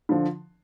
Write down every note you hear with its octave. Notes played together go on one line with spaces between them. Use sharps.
D3 F3